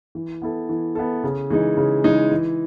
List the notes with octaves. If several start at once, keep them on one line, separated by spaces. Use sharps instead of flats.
E3
B3 E4 A4
E3
B3 E4 A4
C#3
E3 G#3 D#4
C#3
E3 G#3 D#4
E3